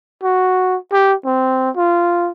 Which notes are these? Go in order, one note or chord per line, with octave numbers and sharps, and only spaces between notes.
F#4
G4
C4
F4